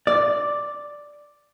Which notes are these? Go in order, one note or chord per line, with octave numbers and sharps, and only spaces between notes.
D5